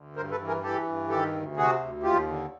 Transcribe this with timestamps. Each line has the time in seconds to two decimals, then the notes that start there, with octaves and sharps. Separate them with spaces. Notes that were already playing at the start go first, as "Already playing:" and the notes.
Already playing: D2
0.16 G2 A#4 C5
0.31 A4 B4
0.40 E3
0.47 G#4 A#4
0.63 E3 G4 A4
0.86 G2
1.10 D#3 G4 A4
1.34 D2
1.57 C3 F#4 G#4
1.80 D2
2.03 D#2 F4 G4
2.27 D3